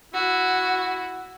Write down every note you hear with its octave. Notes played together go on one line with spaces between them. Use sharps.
E4 F#4